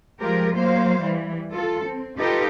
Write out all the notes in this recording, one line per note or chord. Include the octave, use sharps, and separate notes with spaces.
F3 G#3 F4 G4 A#4
F#3 A#3 C5 F5
E3 G3
F4 A4
C4
D#4 F4 G4 A4 B4